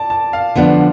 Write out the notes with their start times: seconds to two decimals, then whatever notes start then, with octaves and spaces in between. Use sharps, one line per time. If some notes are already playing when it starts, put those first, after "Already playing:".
Already playing: D5 A5
0.10 A5
0.33 F5
0.55 D3 F3 B3 D4